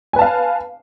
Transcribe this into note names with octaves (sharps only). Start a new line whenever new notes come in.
B4 F5 G#5 A5